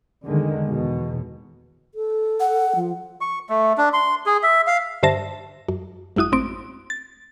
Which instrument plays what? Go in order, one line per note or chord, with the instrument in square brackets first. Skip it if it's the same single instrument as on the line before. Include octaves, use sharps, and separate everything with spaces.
[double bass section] E2 D3 D#3 G#3
E2 B2
[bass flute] A4
[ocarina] F#5
[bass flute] F3
[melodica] C#6
A3
D4
C6
G#4
E5
F5
[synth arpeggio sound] G2 D3 C5 E5 A5 A#6
F#2
G#1 F#2 E4 F#4 D#6
A1 C4 D7
A6